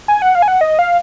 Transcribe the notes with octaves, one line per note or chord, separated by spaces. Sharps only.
G#5
F#5
F5
G#5
F#5
D#5
F5